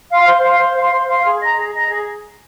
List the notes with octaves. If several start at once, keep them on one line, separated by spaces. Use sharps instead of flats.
F5 C6
C5
F5 C6
C5
F5 C6
C5
F5 C6
G#4
D#5 A#5
G#4
D#5 A#5
G#4